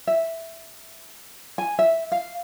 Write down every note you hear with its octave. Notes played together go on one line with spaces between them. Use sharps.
E5
G#5
E5
F5